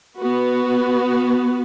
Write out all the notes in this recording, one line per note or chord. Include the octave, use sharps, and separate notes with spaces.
B3 F#4 B4